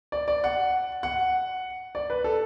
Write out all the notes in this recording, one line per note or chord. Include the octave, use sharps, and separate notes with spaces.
D5
D5
F#5
F#5
D5
B4
A4